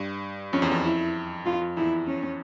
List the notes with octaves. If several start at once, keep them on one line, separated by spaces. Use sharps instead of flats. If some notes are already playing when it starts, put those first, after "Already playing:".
Already playing: G2
F2 C#4
E2
F2
E4
F2 F4
F2
E2 E4
C#4